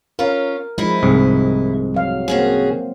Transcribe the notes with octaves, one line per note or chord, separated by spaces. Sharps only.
C#4 F4 A#4
F3 G#3 D#4 E4
C2 G#2
F#3 F5
A#3 C4 C#4 F#4 G#4